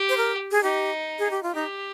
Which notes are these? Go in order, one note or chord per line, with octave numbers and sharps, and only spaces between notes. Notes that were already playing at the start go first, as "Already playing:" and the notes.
Already playing: G4
C5
A#4
G#4
D#4 G4
G#4
G4
F4
D#4 G4